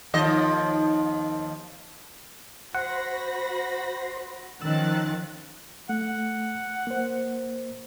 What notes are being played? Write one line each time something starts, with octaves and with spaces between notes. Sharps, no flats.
D#2 F3 D#5
F#4 C5 F#5 B5 A#6
D#3 F3 C#4 E6 F#6 A6
A3 F#5
A#3 C5